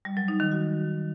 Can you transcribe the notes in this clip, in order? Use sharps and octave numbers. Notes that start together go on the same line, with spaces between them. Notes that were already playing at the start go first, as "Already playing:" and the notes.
G3
F#3
D#4
D#3
F#4